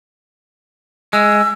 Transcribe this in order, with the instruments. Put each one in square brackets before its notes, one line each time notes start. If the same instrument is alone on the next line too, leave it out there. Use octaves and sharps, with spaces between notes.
[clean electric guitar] G#3 [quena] E6